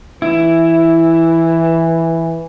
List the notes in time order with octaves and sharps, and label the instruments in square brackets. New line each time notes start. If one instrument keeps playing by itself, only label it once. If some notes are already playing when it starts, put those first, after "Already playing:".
[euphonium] E3 [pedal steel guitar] E4